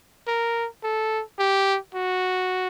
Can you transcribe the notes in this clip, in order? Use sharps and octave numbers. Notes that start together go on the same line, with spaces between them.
A#4
A4
G4
F#4